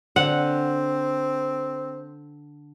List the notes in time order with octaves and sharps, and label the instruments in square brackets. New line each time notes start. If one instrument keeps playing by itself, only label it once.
[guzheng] D3 [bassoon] C4 [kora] F#5